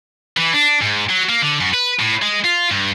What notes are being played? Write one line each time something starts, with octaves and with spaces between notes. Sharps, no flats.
E3
D4
G#2
F#3
A#3
D3
F#2
B4
A2
G#3
F4
G2